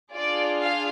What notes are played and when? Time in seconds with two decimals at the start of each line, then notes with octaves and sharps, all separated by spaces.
0.14 D4 F4 G#4 D5
0.59 F5